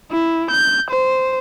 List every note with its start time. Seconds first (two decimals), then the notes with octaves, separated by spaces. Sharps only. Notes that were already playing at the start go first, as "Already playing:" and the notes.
0.11 E4
0.51 G6
0.91 C5